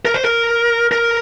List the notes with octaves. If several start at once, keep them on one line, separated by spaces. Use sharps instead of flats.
A#4
C5
A#4
A#4